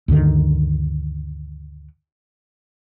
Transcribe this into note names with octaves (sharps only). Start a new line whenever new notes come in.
D2 G2 D3 D#3